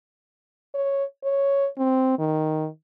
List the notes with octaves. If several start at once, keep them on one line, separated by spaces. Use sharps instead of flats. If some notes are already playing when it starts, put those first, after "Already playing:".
C#5
C#5
C4
D#3